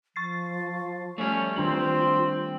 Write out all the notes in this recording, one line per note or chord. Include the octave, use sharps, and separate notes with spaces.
F3 C#6 A6 C7
G3 A3 C#4
D#3 C4 D4 F4 F#7